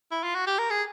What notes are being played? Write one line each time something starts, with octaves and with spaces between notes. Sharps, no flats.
E4
F4
F#4
G4
A#4
G#4